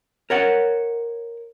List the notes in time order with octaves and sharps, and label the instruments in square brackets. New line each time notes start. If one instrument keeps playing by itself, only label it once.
[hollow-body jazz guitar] A#4 C#5 F#5